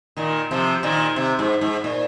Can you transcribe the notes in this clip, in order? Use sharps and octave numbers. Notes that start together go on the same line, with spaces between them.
A#2 D#3
C3 F3
A#2 D#3
C3
G#2
G#2
A#2